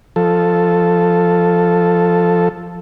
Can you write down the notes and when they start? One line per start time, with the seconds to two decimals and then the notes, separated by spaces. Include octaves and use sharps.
0.16 F3 A4